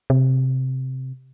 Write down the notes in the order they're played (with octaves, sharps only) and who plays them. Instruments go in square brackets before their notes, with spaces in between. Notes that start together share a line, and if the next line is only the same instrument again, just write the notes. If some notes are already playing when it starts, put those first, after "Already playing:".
[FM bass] C3